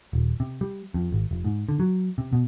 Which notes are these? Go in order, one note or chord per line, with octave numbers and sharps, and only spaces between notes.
D#1
C3
G3
F2
G#1
F1
G#2
D3
F#3
C3
B2